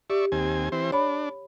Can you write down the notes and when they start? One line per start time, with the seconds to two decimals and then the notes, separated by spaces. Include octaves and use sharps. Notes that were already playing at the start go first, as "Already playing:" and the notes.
0.10 G4 D5 E5 C#6
0.32 D#2 C4 G#5
0.72 E3 C4 C5
0.92 D4 C#5 B5